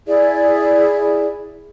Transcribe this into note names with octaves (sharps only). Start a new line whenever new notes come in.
E4 G#4 D5 E5